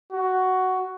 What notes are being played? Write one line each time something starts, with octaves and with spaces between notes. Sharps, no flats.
F#4